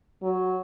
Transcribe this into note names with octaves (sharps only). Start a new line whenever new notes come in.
F#3